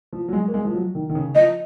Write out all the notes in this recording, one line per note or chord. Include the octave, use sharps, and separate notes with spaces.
F3
F#3
G#3
A#3
G#3
F3
F#3
D#3
D#3
C#3
F3 D#5